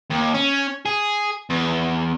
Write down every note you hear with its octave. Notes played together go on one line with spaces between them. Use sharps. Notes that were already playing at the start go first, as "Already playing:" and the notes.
D#2
C#4
G#4
E2